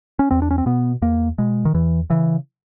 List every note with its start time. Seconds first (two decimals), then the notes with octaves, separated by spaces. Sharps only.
0.19 C#4
0.31 E2 C4
0.42 D4
0.51 C#4
0.58 C4
0.66 B2 B3
1.02 E2 A#3
1.38 B2 G#3
1.65 D#3
1.74 E2 E3
2.10 C#3 E3